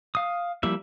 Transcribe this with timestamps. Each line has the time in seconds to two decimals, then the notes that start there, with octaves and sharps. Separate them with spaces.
0.15 F5 D#6
0.63 F3 G3 A#3 E4 E5